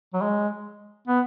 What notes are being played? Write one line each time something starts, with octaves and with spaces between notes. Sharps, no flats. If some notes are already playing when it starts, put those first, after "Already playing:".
F#3
G#3
B3